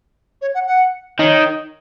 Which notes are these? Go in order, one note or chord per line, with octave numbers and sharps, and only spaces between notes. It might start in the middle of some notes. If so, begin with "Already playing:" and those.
C#5
F#5
F#5
D#3 C#5